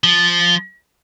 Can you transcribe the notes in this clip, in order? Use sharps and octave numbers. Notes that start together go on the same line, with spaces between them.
F3